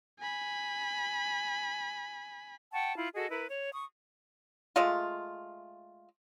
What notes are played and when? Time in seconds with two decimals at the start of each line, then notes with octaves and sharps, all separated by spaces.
0.19 G#5 B5
2.73 F#5 G5 A5 C#6
2.97 E4 F4
3.15 F#4 G#4 A4 D#5
3.30 E4 A#4 B4
3.49 C#5
3.73 C#6 D#6
4.76 G#3 A3 F4